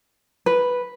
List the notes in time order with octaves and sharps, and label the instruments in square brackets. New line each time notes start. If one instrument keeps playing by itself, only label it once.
[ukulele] B4